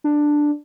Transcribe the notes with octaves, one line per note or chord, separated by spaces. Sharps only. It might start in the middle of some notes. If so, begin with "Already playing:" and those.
D4